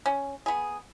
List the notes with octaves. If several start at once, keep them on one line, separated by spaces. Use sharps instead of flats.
C#4
B3 G#4